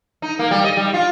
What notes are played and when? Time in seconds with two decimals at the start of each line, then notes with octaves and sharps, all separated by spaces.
0.22 D#4
0.39 A#3
0.51 G3
0.64 D#5
0.77 G3
0.94 F4